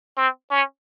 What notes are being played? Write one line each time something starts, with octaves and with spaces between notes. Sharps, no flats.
C4
C#4